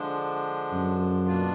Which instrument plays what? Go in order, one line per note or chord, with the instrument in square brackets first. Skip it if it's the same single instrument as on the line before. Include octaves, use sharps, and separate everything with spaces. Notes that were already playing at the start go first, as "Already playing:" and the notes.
Already playing: [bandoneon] D3 F3 G#3 D4
[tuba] F#2
[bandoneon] B2 A#3 D4 F4